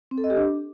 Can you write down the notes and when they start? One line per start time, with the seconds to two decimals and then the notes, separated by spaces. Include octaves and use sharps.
0.11 C4
0.18 A4
0.24 D#5
0.30 G4
0.37 D4